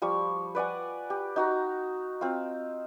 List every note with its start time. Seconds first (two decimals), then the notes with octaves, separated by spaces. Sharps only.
0.02 F3 G3 C#6
0.55 B4 D5 F#5 G#5
1.10 G4
1.36 D#4 F#4 A#5
2.21 C4 F4